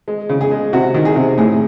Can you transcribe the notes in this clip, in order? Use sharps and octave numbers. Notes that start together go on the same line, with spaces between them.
G#3
C#3
G#4
G#3
C3 F#4
D#3
G#4
C3
A2 G#4